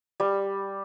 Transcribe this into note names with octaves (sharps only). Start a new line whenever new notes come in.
G3